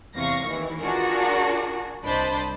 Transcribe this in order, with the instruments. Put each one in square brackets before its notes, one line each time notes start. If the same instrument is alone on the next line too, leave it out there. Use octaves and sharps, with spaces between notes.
[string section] E2 C3 F5 C#6 A#6
D#2 D#3 E3
D4 F4 F#4 G#4 A#4
C2 D4 C5 D#5 A5 B5